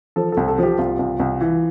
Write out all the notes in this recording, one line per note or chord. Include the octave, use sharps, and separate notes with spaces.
F3 A4
C2 A4
A4
F3 G4
C2 F4
C2
C2
E3